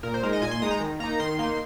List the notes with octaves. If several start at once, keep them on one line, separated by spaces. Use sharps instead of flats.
A#2 A#4
C5
G#3 D#4 A#4
D#5
A#2 G#5
C6
G#3 D#4 D#6
A#5
D#3
A#3 D#4 A#5
D#3 C6
A#3 D#4 C6